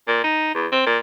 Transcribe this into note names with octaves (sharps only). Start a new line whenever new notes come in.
A#2
D#4
E2
C4
A#2